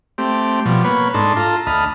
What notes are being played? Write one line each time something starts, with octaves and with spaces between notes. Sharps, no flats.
A3 C4 G4
B2 F3 G3
A#3 B3 B4 C#5
G#2 D4 D#4 A4 C6
F4 A4 A#5
D2 D#5 A5 B5 F6